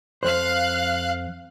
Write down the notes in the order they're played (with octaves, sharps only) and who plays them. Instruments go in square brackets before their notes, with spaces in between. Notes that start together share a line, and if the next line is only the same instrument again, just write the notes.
[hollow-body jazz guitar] F2 C5 [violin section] F5 F#6